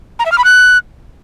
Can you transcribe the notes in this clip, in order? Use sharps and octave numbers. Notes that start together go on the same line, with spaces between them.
A#5
E5
F6
B5
F#6